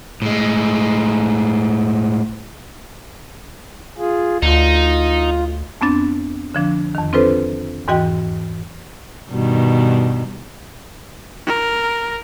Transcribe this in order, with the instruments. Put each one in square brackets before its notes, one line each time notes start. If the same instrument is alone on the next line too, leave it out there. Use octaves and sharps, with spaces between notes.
[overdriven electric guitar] A2 G#3
[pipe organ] F4 G#4
[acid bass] D2 [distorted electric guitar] D#4 [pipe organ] F4
[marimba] F2 B3 C4 D4 A6
D3 F3 D4
F2 D#3
C4 D4 F4 A4 B4 C5
E2 G#2 E3 F#4 D#5 G5
[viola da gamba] G2 B2 D#3
[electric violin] A#4